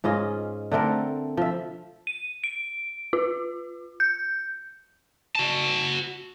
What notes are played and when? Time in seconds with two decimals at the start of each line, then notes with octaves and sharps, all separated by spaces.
0.04 G#2 C#4 F4 D#5
0.72 D3 A3 C4 A#4
1.37 F3 E5
2.07 D#7
2.44 D7
3.13 F4
4.00 G6
5.36 F#4 A5